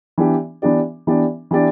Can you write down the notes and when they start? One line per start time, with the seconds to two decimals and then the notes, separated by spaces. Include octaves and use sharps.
0.18 E3 B3 D4 G4 D5
0.62 E3 B3 D4 G4 D5
1.07 E3 B3 D4 G4 D5
1.51 E3 B3 D4 G4 D5